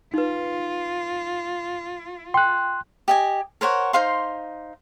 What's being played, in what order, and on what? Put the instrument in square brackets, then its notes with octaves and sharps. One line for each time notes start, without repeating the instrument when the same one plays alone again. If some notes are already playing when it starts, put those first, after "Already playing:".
[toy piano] D#4 B4 [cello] F4
[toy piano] G5 [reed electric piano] C6 F#6
[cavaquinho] G4 D#5 G#5
A#4 C5 C#5 F#5
D#4 C5 F5 C6